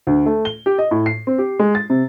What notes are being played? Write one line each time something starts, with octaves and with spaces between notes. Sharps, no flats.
D2
A3
G7
G4
D#5
A2
C7
C4
G4
G#3
A6
C3